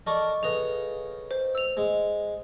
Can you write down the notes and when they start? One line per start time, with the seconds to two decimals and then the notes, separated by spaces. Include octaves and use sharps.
0.07 A4 A#4 D5 D#5 C#6
0.43 C#3 A4 B4 D#5 F7
1.31 C5
1.55 E6 F7
1.77 G#3